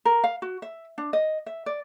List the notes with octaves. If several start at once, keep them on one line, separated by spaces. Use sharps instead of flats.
A#4
F5
F#4
E5
D4
D#5
E5
D5